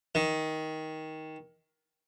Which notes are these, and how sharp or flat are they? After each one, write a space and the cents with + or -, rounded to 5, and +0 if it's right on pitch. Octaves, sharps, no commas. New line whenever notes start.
D#3 +15